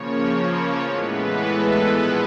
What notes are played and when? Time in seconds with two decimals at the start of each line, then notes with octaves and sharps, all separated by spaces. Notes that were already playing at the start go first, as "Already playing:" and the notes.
Already playing: C#3 F3 A#3 C#5
0.30 C#5
0.82 A2 E3 G#3 B3 B4
1.35 A4
1.87 A#2 F3 G#3 B3 B4